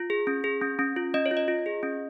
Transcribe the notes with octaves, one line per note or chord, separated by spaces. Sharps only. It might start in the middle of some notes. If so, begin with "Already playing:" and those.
Already playing: F4
G#4
C#4
G#4
C#4
C#4
F4
C#4 D#5
C#5
F4
D#5
F4
G#4
C#4